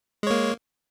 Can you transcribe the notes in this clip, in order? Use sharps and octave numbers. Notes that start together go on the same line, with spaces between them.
G#3 A#3 C#5